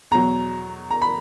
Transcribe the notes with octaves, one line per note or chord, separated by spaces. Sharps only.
E2 B2 F#3 A#5
A#5
B5